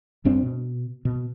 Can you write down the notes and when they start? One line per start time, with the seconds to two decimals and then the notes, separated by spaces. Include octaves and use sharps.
0.24 D1 G2 C4 D4
0.43 B2
1.05 B2